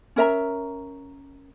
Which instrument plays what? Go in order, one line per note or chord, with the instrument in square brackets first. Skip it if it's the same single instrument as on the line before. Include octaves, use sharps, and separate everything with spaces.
[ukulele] C#4 A#4 E5 A#5